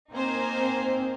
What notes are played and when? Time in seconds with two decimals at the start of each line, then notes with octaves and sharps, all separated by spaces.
0.12 A#3 C4 D#4 C5 G#5
0.59 C4